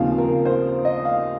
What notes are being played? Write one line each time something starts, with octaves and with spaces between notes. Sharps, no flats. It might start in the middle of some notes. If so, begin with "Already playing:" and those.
Already playing: D#2 C#3 F3 C4 D#4 F5
A#4
C5
D#5
F5